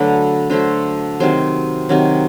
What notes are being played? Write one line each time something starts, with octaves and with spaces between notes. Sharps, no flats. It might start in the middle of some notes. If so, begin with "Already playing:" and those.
Already playing: D3 F#3 A3 B4
D3 F#3 A3 C5
C3 D#3 F#3 C5
C3 D#3 F#3